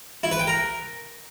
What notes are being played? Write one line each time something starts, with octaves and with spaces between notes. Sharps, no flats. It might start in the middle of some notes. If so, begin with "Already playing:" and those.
E4
B4
G5
A#4